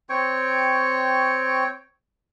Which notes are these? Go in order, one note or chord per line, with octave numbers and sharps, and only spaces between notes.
C4 C#5 G5 C#6